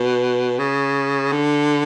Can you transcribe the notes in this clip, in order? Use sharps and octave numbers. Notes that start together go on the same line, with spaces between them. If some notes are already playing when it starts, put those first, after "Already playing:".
Already playing: B2
C#3
D3